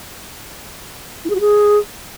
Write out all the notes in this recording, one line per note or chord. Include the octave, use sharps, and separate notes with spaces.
E4
G#4
F#4
G#4